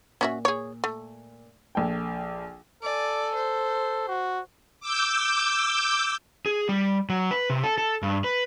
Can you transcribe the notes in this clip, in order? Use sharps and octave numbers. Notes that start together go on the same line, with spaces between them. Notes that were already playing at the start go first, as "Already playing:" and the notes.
A#2 C#4 F#4 E5
G#4 C#5
A3
A#1 A4 G5
A4 D5 G#5
C5
F#4
D6 E6 G6
G#4
G3
F#3
B4
C3
A4
A4
G2
B4